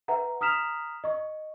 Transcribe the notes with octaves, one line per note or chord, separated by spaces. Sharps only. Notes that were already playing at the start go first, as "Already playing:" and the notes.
B4 E5 F#5 A#5
A#5 D#6 F6 B6 E7 F7
D#5 C#6